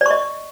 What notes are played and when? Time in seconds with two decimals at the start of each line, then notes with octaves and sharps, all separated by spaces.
0.01 D5
0.06 C#6
0.10 D#5